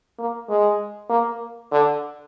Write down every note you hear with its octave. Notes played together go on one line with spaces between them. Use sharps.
A#3
G#3
A#3
D3